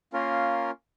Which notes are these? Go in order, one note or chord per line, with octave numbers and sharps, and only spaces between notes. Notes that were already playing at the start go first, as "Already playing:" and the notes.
A#3 C#4 F4 A#4